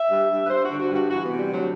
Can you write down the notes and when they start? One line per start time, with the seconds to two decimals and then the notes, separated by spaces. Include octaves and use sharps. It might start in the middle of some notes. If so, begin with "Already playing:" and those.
Already playing: E5
0.10 G2
0.31 G2
0.44 B4
0.50 G2 C5
0.65 F#4
0.70 D3
0.79 F#4
0.90 G2
0.95 F#4
1.10 E3 F#4
1.24 B3
1.29 C3
1.39 G3
1.49 D2
1.54 F#3